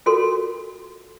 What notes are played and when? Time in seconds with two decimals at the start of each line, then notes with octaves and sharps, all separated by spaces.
0.06 F4 F#4 A4 A#4 C6